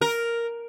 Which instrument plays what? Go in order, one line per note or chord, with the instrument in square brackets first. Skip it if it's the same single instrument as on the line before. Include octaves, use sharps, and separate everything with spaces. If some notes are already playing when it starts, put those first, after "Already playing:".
[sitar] A#4